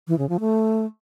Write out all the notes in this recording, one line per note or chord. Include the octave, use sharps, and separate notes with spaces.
E3
C#3
F3
A3